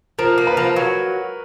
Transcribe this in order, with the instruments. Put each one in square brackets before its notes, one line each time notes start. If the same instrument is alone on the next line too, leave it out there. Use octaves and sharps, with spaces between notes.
[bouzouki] F3 [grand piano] A#4
[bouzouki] A#3
[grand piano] B4
[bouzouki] F3
F#3